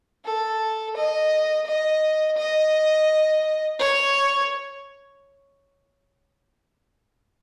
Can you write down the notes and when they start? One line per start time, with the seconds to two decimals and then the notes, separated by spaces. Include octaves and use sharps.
0.25 A4
0.96 D#5
1.66 D#5
2.37 D#5
3.79 C#5